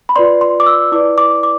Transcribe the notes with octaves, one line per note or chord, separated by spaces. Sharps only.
B5
F4 B4 D5 C6
C6
D6
E6
E4 B4 D5 D6
D6
D6